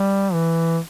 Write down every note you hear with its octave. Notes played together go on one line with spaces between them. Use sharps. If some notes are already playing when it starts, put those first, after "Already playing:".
Already playing: G3
E3